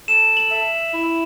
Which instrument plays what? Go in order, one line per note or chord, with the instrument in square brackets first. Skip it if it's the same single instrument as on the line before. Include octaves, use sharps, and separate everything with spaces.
[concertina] A4 [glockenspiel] E7
[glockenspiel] F#7
[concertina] E5
E4